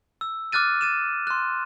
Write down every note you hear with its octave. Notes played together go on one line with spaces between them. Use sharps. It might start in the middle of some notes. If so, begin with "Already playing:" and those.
E6
D6 F6 F#6 A6 D#7
A6 D#7 E7
C6 F#6